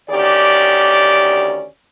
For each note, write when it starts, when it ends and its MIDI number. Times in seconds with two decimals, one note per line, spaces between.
0.10 1.66 38
0.10 1.66 51
0.10 1.66 61
0.10 1.66 67
0.10 1.66 74